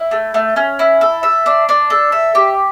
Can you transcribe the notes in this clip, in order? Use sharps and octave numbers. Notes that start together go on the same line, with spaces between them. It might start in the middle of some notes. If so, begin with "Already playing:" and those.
Already playing: E4
A3
A3
C#4
E4
A4
E5
D4
D4
A4
E5
G4